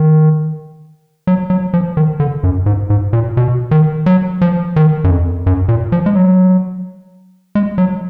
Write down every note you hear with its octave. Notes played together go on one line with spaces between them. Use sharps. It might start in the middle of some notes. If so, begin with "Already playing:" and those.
Already playing: D#3
F#3
F#3
F3
D#3
D3
F#2
G#2
G#2
A#2
B2
D#3
F#3
F3
D#3
F#2
F2
F#2
A#2
F3
G#3
F#3
G#3
F#3